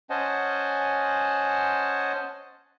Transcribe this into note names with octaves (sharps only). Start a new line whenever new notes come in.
C#4 C5 D#5 F#5 G#5 A5